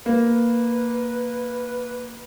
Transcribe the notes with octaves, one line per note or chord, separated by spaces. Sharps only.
A#3 B4